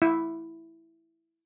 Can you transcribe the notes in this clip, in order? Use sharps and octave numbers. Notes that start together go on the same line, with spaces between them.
E4